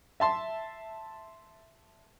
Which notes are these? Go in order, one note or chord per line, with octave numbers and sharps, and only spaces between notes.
E5 A5 C6